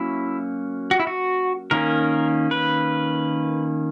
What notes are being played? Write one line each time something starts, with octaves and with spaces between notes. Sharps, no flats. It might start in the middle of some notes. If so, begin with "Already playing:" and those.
Already playing: F#3 A#3 C#4 E4
F#4
E4
F#4
D#3 A#3 C#4 A#4
B4